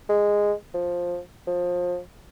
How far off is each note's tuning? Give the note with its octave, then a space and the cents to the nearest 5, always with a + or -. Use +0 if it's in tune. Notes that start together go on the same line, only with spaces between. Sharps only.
G#3 -10
F3 +10
F3 +25